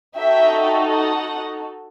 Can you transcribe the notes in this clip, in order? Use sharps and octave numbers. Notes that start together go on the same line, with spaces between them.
D#4 F#4 A4 E5 G5
D#5 F#5